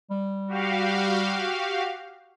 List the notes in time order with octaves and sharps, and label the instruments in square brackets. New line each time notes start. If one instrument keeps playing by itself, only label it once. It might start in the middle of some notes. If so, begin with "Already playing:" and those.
[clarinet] G3
[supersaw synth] F#4 G4 F5